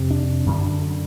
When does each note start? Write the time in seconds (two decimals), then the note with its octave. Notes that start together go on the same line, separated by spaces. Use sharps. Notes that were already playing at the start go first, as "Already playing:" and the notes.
Already playing: F2 C3
0.11 D4
0.46 F#2 D3